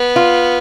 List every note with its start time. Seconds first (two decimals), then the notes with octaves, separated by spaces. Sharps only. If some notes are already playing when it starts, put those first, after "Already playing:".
Already playing: B3
0.16 F4